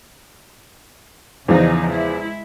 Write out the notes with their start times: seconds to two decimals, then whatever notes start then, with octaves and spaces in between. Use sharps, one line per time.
1.48 E2 C#3 E3 F3 D#4
1.89 G#3 E4